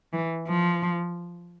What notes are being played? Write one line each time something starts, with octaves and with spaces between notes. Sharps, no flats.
E3
F3